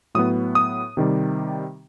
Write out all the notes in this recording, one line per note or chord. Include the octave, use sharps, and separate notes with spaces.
A2 F#3 B3 D#6
D#6
C3 D#3 G3